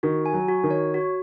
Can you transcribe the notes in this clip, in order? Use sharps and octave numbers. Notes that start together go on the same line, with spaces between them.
D#3 F#4
G#5
F#3
F#4
D#3
C#5
F#4